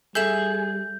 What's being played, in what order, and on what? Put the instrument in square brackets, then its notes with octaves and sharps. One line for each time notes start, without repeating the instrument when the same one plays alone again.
[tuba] G3 [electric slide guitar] G#4 [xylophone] A4 E5 E7 [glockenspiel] G6